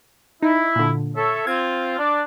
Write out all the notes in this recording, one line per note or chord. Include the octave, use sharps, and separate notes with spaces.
D#4 E4
A#2 D3
A4 C#5 E5
C4 F4 G#6
D4 D5